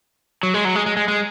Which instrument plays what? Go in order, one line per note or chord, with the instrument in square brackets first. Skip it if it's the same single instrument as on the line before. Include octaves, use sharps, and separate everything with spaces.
[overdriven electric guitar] F#3
G#3
F#3
G#3
G#3
G#3
G#3